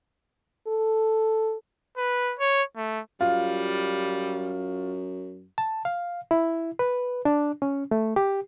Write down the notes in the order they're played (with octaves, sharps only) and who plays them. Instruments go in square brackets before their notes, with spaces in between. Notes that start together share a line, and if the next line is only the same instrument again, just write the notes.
[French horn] A4
[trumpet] B4
C#5
A3
[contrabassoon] F#2 [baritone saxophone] G3 [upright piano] F4
[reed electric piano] A5
F5
E4
B4
D4
C#4
A3
G4